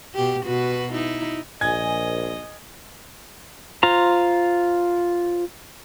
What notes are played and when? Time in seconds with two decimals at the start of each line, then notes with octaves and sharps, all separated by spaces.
0.15 B2 G4
0.45 B2 F#4 B4
0.93 D#4 E4
1.61 A#1 D#5 G#5 G#6
3.83 F4 C5 A#5